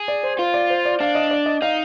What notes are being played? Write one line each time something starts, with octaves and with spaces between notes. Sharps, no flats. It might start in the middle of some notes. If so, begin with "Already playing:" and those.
Already playing: G#4
D5
C5
F4 C5
D5
C5
D5
D4 F5
D#5
D5
D#5
D#4 F5